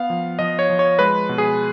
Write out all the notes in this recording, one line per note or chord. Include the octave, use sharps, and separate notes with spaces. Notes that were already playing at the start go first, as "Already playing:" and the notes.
Already playing: B3 F5
F3
F3 D#5
C#5
F3
C#5
G#3 B4
B2
G#4